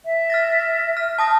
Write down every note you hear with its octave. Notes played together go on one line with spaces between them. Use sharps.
E5
F6 A6 A#6
F6
A5 D#6 A#6